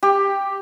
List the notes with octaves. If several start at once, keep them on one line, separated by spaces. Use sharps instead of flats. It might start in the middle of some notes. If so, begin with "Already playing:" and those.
G4